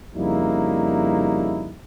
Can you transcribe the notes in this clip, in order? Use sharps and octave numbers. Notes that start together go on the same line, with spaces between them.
F2 C#3 G3 A#3 D#4 E4